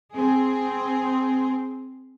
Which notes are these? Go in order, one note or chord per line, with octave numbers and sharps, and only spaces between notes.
C4 G#4